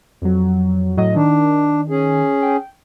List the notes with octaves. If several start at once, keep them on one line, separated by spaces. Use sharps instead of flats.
F2 F#3
A2 F#3 D#5
D#3 D4
C#4 G#4
G5